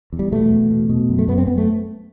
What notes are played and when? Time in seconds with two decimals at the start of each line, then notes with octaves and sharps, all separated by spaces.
0.13 E2
0.19 G3
0.32 B2 A3
0.51 E2
0.71 B2
0.89 B2
1.09 F#2
1.19 A3
1.28 F#2 B3
1.38 C4
1.47 F#2 B3
1.58 A3